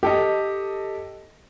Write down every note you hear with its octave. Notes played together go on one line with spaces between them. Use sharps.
G4 A4 D#5